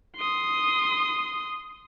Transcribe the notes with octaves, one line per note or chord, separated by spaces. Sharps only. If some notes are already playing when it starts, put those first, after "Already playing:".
C6 D#6